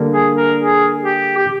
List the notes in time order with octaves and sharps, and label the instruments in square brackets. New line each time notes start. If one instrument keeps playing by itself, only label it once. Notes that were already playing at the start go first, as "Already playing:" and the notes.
Already playing: [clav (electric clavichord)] D3 G3 A#3 D4
[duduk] G#4
A#4
G#4
G4
G4